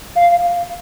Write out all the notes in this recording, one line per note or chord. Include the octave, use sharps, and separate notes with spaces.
F5